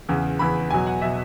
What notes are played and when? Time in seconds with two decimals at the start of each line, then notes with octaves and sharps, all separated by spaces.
0.09 E2 C#3 E3
0.39 E2 C#3 E3 B5
0.70 E2 B2 F#3 G#5
0.87 F#5
1.02 B2 F#3 E5